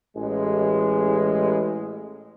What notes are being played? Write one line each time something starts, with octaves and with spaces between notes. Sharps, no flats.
A1 G#3